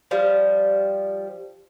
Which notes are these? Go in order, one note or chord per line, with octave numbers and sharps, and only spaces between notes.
F3 G3